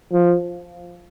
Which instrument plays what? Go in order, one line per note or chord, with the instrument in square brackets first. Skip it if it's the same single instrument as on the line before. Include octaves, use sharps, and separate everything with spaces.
[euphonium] F3